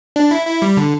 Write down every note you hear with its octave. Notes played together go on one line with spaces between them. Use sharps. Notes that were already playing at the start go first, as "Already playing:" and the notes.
D4
E4
E4
G3
D3